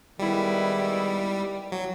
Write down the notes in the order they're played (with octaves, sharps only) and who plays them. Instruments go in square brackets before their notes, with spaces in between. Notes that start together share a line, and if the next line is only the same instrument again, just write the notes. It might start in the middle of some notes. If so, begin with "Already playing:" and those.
[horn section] D#3 G#3 B3 E4 [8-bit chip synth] G3
[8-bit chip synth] F#3